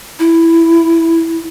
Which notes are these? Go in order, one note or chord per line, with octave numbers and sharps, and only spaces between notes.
E4